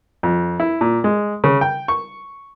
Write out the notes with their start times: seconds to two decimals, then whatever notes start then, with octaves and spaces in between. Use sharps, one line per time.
0.23 F2
0.60 E4
0.81 A#2
1.04 G#3
1.44 C#3
1.61 G5
1.88 C#6